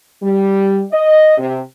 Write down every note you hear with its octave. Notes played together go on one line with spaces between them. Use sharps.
G3
D#5
C3